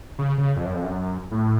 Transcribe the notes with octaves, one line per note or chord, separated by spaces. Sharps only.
C#3
C#3
F2
F#2
F2
F#2
A2